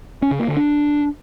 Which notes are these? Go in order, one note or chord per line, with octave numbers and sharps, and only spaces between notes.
C#4
C#3
A#3
D3
D4